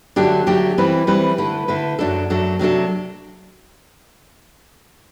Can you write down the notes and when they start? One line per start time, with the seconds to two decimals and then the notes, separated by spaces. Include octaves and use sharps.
0.16 D3 F#3 A3 D4 G4
0.47 D3 F#3 A3 D4 G4
0.78 E3 G3 C4 E4 B4
1.07 E3 G3 C4 E4 B4
1.38 D3 A3 E4 B4
1.68 D3 A3 E4 B4
1.99 F#2 F#3 A3 D4 A4
2.30 F#2 F#3 A3 D4 A4
2.59 C3 F#3 A3 D4 A4